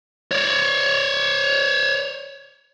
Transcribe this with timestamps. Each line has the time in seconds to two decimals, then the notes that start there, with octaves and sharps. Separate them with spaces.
0.31 C#5 D5